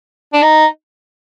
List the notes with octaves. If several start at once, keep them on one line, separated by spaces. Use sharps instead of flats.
D4
D#4